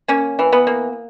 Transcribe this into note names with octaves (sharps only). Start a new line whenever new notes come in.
A#3 C#4
E3
B3
A#3